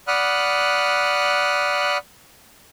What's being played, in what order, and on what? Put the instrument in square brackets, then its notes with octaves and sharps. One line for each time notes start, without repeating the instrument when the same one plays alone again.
[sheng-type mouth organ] D5 F#5 B5 D#6 F6 F#6